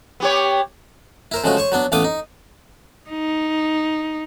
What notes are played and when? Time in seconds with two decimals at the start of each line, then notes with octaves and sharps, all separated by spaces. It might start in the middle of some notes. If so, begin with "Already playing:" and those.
0.20 B3 G4 C#5
1.32 E4 A#4 C5
1.44 C#3 F3 G#3 A3 F#4
1.57 C5 C#5 C#6
1.72 F#3 B3 D4
1.92 A1 A3 B3 F5 D6 D#6
2.04 D#4
3.10 D#4